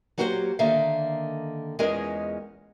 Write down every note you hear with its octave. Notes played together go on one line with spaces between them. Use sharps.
F#3 A#3 F#4 G4 B4 C5
D3 D#3 A#3 A4 E5 F5
E2 G#3 C#4 F4 A#4 D#5